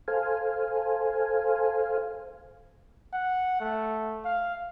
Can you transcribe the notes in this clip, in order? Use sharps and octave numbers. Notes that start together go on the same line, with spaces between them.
A4 C5 F5 G#5
F#5
A3
F5